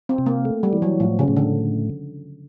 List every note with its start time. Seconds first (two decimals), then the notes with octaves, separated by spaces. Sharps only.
0.09 C4
0.18 C3
0.26 A#3
0.45 A3
0.63 G3
0.73 E3
0.82 F#3
1.00 A2 F3
1.19 C#3
1.28 A2
1.37 D3